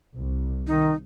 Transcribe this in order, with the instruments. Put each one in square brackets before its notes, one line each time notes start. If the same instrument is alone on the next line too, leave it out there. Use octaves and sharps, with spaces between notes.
[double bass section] C2
[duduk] D#3 [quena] D#4